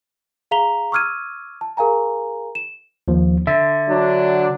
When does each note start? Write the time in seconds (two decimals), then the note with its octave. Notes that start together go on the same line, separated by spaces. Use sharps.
0.51 G#4 F5 A#5 B6 F7 G7
0.92 C#6 D6 E6 F6 G#6 D#7
1.61 A5
1.77 G#4 A#4 F5 G#5 A#5
2.55 E7
3.08 D#2 F3
3.47 D3 E5
3.89 F#3 D4